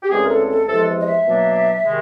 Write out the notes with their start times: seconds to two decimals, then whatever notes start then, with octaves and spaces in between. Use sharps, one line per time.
0.03 G4
0.10 D2 C#3 E3 G#3 C4 G#4
0.23 A#4
0.29 A4
0.49 A4
0.68 E2 C3 F3 G#3 A4
1.00 D#5
1.06 E5
1.25 B2 F#3 A#3 D4
1.83 C3 D#3 G#3